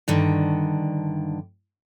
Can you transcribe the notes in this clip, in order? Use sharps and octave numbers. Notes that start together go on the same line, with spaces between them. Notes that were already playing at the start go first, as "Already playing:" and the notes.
G2 D3 D#3